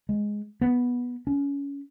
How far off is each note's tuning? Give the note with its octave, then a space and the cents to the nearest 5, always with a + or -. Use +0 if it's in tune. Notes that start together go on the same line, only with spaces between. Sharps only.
G#3 +0
B3 -10
C#4 +25